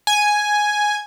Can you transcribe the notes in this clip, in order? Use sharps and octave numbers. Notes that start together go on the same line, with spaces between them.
G#5